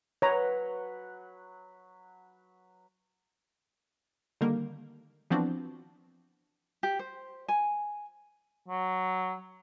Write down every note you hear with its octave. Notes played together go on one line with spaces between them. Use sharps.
F#3 B4 C#5 A#5
D3 D#3 G3 A#3
E3 F3 B3 C4 D4 F#4
G4
C5
G#5
F#3